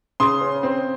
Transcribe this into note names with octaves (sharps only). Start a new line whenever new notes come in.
C#3 C6 D#6
C#4
C4